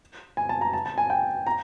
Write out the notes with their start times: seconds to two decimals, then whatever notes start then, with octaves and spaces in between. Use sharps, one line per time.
0.37 G#5
0.49 A5
0.61 A#5
0.73 A5
0.86 A5
0.98 G#5
1.10 G5
1.47 A#5